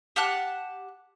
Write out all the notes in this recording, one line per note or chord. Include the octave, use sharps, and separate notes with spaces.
G4 F#5 A5 F#6